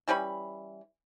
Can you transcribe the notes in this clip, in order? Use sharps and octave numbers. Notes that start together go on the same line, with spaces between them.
E3 G3 C#4 B5